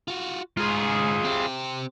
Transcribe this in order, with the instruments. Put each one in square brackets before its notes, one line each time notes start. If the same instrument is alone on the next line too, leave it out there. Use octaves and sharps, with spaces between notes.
[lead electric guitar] F4 F#4
[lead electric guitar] G#2 [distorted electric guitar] F4 G#4
[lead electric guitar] C4 G4